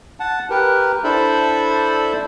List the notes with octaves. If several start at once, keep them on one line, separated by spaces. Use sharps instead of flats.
F#5 A5
G4 A#4 B4
D4 E4 A4 C5 E5 B5